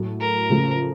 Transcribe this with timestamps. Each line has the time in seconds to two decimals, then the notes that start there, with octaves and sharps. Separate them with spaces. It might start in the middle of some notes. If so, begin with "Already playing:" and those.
Already playing: A2 F#3 A3
0.20 A#4
0.49 C#3 F3 A3